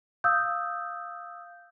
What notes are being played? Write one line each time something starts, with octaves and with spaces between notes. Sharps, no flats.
F5 D#6 E6 G6